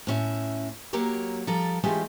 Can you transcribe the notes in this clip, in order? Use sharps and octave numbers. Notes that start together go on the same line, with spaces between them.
A2 C#4 E5
F#3 A#3 G4 A#4 C#5
F3 G3 A4 A#5
E3 G#3 A3 C#4 F4 G4